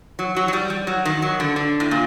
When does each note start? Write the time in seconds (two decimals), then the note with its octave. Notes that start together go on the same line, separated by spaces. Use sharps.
0.19 F#3
0.36 F#3
0.48 F#3
0.53 G3
0.70 G3
0.87 F#3
1.05 D#3
1.22 F#3
1.40 D3
1.56 D3
1.80 A2
1.91 A#2